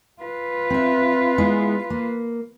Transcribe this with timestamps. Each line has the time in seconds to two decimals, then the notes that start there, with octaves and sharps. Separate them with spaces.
0.22 F4 B4
0.70 C4 E5
1.38 G#3 B3 E4
1.90 A#3